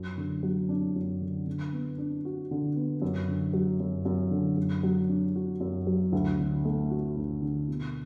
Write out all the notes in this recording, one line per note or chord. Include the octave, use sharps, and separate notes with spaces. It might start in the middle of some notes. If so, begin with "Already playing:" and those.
Already playing: F#2
D3
F#3
D4
F#2
D3
D3
B3
D4
F#4
D3
B3
F#2
D3
F#3
F#2
F#2
D3
F#2
F#3
D4
F#4
F#2
F#3
D2
D3
A3
F#4
D2
D3
B2